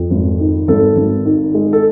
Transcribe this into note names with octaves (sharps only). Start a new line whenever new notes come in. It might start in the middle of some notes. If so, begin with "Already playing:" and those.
Already playing: F2
G#1
D#3
G#1 A4
G#1
D#3
G#3
A4